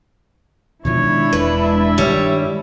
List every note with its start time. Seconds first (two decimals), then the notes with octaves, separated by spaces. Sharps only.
0.85 B2 D#3 F3 G#3 D4 E4 C#5
1.33 E1 B4
1.62 E5
1.98 G2 D#3 G3 C#5